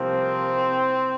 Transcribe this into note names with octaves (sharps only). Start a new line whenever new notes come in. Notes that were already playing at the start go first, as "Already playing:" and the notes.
Already playing: C2 C3 F3 A#3 C4